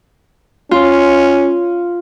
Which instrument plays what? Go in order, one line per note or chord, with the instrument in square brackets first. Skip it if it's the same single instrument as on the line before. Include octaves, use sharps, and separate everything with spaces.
[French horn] C#4 [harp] F4